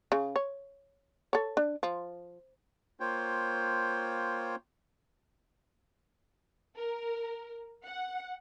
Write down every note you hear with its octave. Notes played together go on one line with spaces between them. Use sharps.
C#3
C#5
A4 C#5
D4
F3
A#3 F4 C5 C#5 G5
A#4
F#5